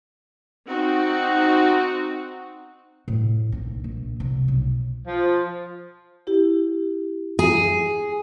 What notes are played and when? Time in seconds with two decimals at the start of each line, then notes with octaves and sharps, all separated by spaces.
0.66 C4 D#4 F#4
3.08 A2
3.52 A#1 D#4
3.84 A#1
4.20 C2
4.48 B1
5.06 F3
6.27 E4 G4
7.39 G#4